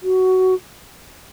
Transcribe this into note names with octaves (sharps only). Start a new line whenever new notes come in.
F#4